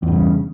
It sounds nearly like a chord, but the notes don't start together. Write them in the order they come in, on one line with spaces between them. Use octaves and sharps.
E2 G2 C#3